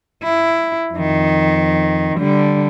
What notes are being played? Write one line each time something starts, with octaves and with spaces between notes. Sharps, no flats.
E4
F2 D#3
D3 G3